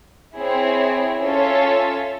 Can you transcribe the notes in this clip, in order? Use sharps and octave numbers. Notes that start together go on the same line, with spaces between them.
C4 E4 G#4 C#5
C#4 F4 A4 C#5 E5